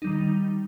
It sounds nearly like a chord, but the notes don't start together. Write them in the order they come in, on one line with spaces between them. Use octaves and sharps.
D#4 G3 D#3